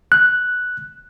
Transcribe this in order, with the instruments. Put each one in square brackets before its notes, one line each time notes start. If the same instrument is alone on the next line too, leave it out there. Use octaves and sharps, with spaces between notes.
[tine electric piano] F#6